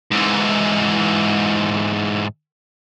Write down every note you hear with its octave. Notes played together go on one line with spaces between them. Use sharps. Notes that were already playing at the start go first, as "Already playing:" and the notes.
G#2 E3